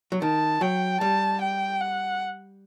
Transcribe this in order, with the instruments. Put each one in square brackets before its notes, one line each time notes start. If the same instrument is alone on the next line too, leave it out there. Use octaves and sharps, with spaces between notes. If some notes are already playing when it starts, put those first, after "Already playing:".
[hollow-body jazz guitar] F#3
[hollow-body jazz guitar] D#3 [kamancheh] A5
[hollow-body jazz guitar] F#3 [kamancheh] G5
[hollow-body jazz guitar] G3 [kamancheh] A5
[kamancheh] G5
F#5